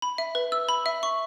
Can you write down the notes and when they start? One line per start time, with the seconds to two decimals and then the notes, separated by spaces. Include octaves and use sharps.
0.02 B5
0.18 E5
0.35 B4
0.52 E6
0.69 B5
0.86 E5
1.03 C#6